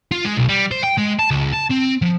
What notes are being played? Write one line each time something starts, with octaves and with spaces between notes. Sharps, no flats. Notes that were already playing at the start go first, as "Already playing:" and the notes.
F4
G#3
B1
G3
C5
G5
G#3
A5
C#2
A5
C4
F3